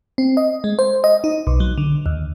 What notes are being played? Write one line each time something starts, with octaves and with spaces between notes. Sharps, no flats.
C4
D#5
G#3
C5
D#5
D#4
B1
F#3
D3
D#2